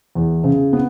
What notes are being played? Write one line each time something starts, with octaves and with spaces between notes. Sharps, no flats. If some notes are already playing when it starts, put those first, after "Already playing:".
E2
C#3
B3